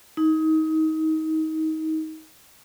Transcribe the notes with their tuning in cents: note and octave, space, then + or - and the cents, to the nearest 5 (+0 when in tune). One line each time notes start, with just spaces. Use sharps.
D#4 +25